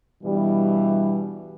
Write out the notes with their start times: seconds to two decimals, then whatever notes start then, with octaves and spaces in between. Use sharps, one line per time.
0.24 G2 B2 E3 G3